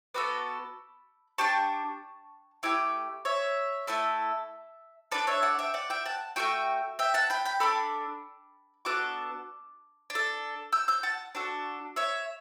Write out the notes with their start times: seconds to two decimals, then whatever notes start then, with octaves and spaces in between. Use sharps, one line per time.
0.14 B3 F#4 A4 B5 D6
1.38 D4 G4 A5 C#6
2.63 A3 E4 G4 D6
3.25 C#5 E5
3.87 A3 E4 A4
5.11 D4 A4 B4 D5
5.27 C#5 E5
5.42 D5 F#5
5.59 E5 G5
5.74 D5 F#5
5.90 E5 G5
6.06 F#5 A5
6.36 A3 D4 F#4 E5 G5
6.99 E5 G5
7.14 F#5 A5
7.30 G5 B5
7.45 G5 B5
7.60 D4 A4 B5 D6
8.85 B3 D4 F#4 A4 D6 F#6
10.10 D4
10.15 A4
10.72 E6 G6
10.88 E6 G6
11.03 F#5 A5
11.35 D4 F#4 A4
11.96 C#5 E5